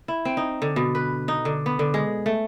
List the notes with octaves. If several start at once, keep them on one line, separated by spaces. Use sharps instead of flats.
E4
C4
D#4
D3
B2
B4
D#4
D3
B3
D3
G#3
A3